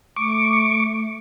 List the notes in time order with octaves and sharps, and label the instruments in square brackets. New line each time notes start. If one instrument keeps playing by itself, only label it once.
[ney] A3 [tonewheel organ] C#6 D6